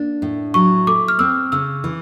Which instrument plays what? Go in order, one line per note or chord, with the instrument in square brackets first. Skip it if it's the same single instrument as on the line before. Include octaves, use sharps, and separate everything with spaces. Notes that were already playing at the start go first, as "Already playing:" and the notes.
Already playing: [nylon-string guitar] A#3 D4
A2
[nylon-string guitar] F#3 [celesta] C#6
[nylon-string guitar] A3 [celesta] D6
[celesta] F6
[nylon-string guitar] C4 [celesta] E6
[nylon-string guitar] C#3 [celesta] E6
[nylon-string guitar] E3